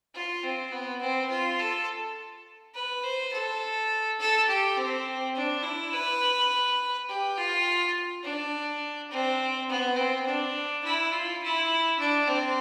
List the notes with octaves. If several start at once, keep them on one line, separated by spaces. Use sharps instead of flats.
F4
C4
B3
C4
F4
A4
B4
C5
A4
A4
G4
C4
D4
E4
B4
G4
F4
D4
C4
B3
C4
D4
E4
F4
E4
D4
C4